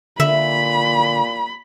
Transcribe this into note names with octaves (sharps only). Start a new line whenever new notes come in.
A#2 D3 E5 B5